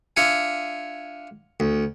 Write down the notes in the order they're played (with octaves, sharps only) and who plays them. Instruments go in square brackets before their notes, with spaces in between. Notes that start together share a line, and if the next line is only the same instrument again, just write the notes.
[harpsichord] D4 F4 E5 F#5 G#5
D2